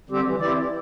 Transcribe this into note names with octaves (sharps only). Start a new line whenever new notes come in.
D3 G3 C4 G4
E3
C4 E4 G4 D5
E3